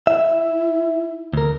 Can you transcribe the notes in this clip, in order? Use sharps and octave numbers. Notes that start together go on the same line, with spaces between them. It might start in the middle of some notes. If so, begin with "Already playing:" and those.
E4 E5
D2 A#4